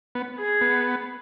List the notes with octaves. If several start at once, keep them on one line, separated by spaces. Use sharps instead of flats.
B3
G#4
B3